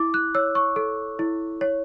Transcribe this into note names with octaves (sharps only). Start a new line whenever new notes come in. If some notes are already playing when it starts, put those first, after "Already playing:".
Already playing: E4 D6
F#6
C#5 E6
C#6
A4
E4
C#5